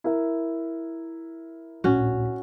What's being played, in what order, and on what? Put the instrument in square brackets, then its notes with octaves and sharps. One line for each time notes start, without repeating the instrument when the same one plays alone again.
[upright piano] E4 A#4 E5
[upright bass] D1 A#1 [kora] C#4 F#4